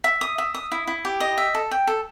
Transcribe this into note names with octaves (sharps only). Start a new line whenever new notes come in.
E5
D#6
E5
D#6
E4
E4
G4
D#5
E5
A4
G5
A4